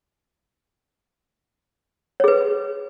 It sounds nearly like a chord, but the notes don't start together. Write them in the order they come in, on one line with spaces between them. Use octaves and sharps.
C#5 G#4 B4